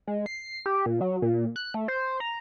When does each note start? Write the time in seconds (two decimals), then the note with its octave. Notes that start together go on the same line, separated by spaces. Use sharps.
0.07 G#3
0.26 C7
0.66 G4
0.86 A#2
1.01 F#3
1.22 A#2
1.56 F#6
1.74 A3
1.88 C5
2.20 A#5